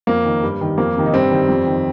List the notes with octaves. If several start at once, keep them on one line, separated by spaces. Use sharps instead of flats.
F2 A#3
D#3
G2 G3
D#3
F2 A#3
C3 D#3
D#4
G2 G3 C4
D#3
F2
D#3